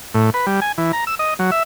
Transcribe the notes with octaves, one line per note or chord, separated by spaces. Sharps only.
A2
B4
G3
G#5
E3
A#5
E6
D#5
F#3
E5